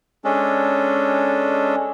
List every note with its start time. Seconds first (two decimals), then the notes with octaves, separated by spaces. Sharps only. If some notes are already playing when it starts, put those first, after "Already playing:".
0.25 G#3 C#4 D4 A4